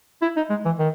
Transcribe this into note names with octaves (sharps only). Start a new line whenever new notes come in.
E4
D#4
G#3
E3
D#3